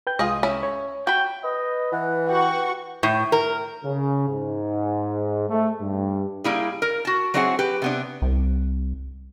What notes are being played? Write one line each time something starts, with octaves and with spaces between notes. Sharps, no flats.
B4 G5 G6
C2 G#3 F4 G#4 D#5 D#6
C#4 E4 B5
C#5
F#4 G5 B5
B4 D#5
E3 F#5
F#4 G4 F#5 C#6
A2
A#4
C#3
G#2
A3
G2
G3 A#3 E4 G#4
A#4
F#4 A5
F#3 C4 D4 E4 G#4 F#5
G4 B4
C3 B3 D4
C2